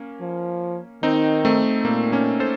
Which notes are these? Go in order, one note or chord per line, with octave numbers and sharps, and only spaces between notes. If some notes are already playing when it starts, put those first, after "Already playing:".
Already playing: A#3 C#4
F3
D#3 C4 D#4
A3 C4
A#2 A#3
A#3 C#4
A4 C5